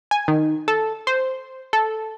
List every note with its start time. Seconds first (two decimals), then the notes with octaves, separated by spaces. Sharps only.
0.11 G#5
0.28 D#3
0.68 A4
1.07 C5
1.73 A4